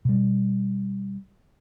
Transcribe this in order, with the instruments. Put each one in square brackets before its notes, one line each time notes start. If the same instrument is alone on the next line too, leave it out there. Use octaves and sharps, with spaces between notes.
[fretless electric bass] B2 G3